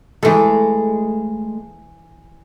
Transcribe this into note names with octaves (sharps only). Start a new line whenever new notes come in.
E3 G#3 A3 A4